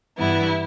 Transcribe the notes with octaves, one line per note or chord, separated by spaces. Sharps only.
G2 E3 B3 E4